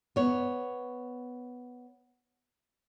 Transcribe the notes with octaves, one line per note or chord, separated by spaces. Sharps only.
B3 C#5